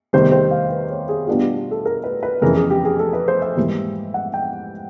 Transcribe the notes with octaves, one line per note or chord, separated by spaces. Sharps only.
E2 C3 D#3 G3 C4 C5
C5
F5
B4
C#5
G#4
B2 G3 B3 D4 F4 G4
G4
A4
A#4
B4
B4
F2 C#3 E3 A#4
G#4
G4
G#4
A4
B4
C5
E5
G#2 E3 G3 A#3
F#5
G5